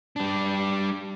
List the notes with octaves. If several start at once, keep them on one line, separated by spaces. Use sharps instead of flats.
G3 D4